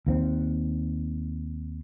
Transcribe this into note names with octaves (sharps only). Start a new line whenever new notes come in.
D#2 A#3 C4